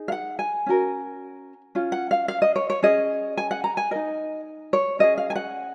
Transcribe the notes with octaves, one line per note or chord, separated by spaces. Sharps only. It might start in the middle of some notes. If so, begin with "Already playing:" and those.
Already playing: D#4 G#4
F5
F#5
G#5
C#4 F#4 A#4
C#4 F4
F#5
F5
F5
D#5
C#5
C#5
C#4 G#4 D#5
G#5
F#5
A#5
G#5
D#4 A#4 D#5
C#5
C#4 G#4 D#5
F5
G#5
F#5